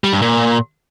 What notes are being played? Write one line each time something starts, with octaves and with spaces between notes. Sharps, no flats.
G3
G2
A#2